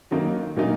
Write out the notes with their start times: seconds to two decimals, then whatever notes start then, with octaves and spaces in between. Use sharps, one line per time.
0.11 D#3 F#3 A#3 D#4
0.56 A#2 F#3 A#3 D#4